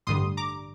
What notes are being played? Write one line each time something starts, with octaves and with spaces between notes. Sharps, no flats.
A1 G2 D3 G3 C6 D#6
A#5 D6